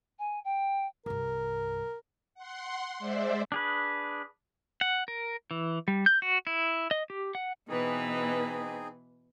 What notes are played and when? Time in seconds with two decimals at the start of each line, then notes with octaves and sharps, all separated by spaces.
0.18 G#5
0.44 G5
1.06 C2 G2 A#4
2.35 F#5 C6
2.99 G#3 C5 D5 E5
3.52 D4 G#4 B4
4.81 F#5
5.08 A#4
5.51 E3
5.88 G3
6.06 G6
6.22 F#4
6.47 E4
6.91 D#5
7.10 G4
7.35 F#5
7.69 B2 E3 C4 D#4 G#4 B4